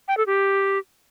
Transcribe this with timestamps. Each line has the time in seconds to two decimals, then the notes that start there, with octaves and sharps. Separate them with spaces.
0.08 G5
0.17 A4
0.27 G4